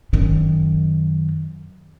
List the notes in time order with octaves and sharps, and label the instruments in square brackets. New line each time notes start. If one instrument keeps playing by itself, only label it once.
[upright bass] F#2 D#3